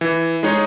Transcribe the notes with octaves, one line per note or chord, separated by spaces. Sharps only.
E3
G#3 D#4 G#4 C#5